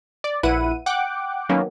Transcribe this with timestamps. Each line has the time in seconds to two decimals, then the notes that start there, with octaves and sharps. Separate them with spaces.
0.24 D5
0.43 A#1 E4 B4 F#5 D#7
0.86 F#5 G5 D6 F#6
1.49 D#3 F#3 A#3 B3 C#4